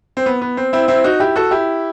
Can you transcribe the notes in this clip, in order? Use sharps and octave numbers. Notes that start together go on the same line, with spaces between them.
C4
B3
B3
C4
C4 E4
C4 E4
D#4 F#4
E4 G4
F#4 A4
E4 G4